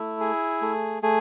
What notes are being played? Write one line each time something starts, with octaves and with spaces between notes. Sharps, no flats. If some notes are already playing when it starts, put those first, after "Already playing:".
Already playing: A3 E4
G#4
A3
A3 G#4